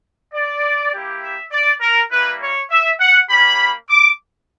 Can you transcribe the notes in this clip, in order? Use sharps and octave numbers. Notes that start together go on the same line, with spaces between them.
D5
A#3 E4 G4
E5
D5
A#4
G3 A#3 E4 B4
C#5
E5
F#5
A#3 C#4 G4 B5
D6